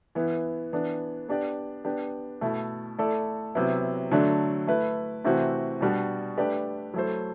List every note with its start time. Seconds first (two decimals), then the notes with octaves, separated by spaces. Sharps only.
0.15 E3 B3 E4
0.73 E3 B3 D4
1.29 B3 D4 G4 D5
1.85 B3 D4 G4
2.41 B2 A3 E4
2.99 A3 E4 A4 D5
3.55 C3 F#3 B3 E4
4.11 D3 F#3 A3 D4
4.67 A3 E4 B4
5.24 C3 E3 A3 C4 F#4
5.81 B2 G3 D4 F#4
6.38 A3 D4 G4 B4 D5
6.94 F#3 A3 E4 A4 C5